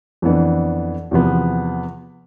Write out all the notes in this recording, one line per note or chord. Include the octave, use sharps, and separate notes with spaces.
F2 E3 B3 D4
E2 C3 F3 B3